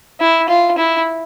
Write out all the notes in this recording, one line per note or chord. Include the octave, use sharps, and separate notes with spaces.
E4
F4
E4